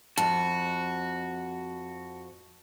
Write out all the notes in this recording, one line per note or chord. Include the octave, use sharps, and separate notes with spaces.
F2 F#4 A5